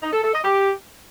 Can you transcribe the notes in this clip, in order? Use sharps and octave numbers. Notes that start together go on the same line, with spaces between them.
D#4
A4
A4
D#5
G4